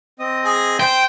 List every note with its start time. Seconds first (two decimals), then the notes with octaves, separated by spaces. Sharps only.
0.19 C4 D#5 D#6
0.45 G#4
0.80 C5 G5